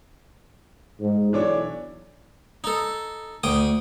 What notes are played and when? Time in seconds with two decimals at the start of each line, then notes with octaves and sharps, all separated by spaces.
1.01 G#2
1.33 B1 E3 D4 C#5
2.64 D#4 A4
3.43 D2 G5 D#6